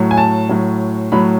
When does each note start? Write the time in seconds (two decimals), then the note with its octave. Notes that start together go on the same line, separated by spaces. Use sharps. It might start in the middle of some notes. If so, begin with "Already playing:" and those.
Already playing: A2 F#3
0.11 G#5
0.18 A5
0.49 A2 F#3
1.12 A2 F#3 B5